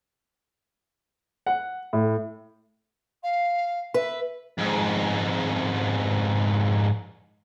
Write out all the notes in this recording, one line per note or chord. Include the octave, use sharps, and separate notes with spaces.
F#5
A2
F5
B4 E5
F2 G#2